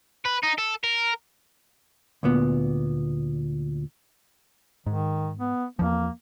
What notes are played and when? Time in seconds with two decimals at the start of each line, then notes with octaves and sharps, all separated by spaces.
0.25 B4
0.43 D#4
0.58 A4
0.84 A#4
2.23 D2 A#2 B3
4.86 G#2 D#3
5.38 B3
5.79 E2 F3 A#3